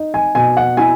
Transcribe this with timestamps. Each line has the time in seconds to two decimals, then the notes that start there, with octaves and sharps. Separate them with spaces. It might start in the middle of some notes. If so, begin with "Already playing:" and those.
Already playing: D#4
0.14 G#5
0.35 B2 G#5
0.57 F#5
0.77 E4 G#5